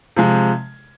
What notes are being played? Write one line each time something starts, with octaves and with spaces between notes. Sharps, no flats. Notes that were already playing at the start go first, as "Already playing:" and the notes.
C3 F3 G#3